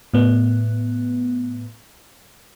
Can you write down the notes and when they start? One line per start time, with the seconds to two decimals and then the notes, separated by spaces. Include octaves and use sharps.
0.14 A2 B3